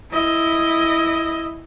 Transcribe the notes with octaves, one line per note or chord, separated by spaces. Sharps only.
E4 D#5